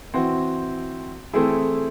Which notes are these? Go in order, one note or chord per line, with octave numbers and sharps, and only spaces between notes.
E3 C4 F#4
E3 A3 C4 E4 G#4